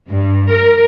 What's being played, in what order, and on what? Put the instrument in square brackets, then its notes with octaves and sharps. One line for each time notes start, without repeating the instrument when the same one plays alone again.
[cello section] G2
A#4